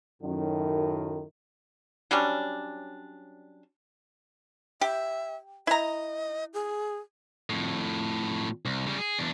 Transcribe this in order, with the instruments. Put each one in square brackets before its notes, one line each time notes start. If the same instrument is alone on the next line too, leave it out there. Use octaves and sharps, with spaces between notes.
[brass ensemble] F#2 A2 D#3
[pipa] F#3 G3 C#4 D4
[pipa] G4 [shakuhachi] E5
[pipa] E4 A#5 [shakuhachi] D#5
[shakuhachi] G#4
[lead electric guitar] F2 A2
C2
C#3 G3
G#4
E2 D4